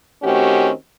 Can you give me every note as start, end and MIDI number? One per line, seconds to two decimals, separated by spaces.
0.23 0.71 51
0.23 0.71 57
0.23 0.71 60
0.23 0.71 61
0.23 0.71 66
0.23 0.71 67